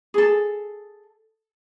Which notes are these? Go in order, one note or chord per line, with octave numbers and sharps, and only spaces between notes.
G#4 A4